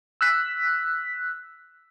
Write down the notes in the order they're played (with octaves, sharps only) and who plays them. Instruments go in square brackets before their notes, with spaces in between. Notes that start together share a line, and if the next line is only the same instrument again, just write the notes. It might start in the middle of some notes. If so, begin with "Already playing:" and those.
[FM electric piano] E6 F#6 B6